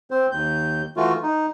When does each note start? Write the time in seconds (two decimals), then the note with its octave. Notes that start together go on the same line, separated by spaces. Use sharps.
0.11 C4 C5
0.32 D#2 G6
0.97 E3 A3 F4 F#4
1.23 D#4